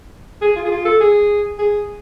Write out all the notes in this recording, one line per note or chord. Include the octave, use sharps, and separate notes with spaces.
G#4
F4
G#4
F4
A4
G#4
G#4